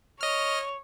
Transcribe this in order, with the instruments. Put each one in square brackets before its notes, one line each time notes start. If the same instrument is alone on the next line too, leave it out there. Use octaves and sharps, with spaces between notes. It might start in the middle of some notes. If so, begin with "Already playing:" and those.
[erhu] C#5 [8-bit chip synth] D#5 F6